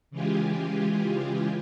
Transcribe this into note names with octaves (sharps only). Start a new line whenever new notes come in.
C#3 E3 G#3 F4 G4 G#4